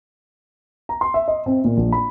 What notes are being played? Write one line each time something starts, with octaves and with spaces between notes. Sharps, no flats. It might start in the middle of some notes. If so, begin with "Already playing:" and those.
A#5
C6
E5
D#5
C4
A#2
A#1
B5